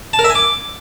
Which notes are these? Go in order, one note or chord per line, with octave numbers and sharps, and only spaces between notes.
A5
A#4
E5
G#5
D6